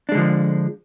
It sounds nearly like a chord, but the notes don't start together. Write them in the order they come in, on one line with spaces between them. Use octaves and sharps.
D4 G#3 D3 F3